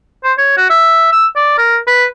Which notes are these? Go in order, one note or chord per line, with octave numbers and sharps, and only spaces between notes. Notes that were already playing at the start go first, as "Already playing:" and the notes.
C5
C#5
F#4
E5
E6
D5
A#4
B4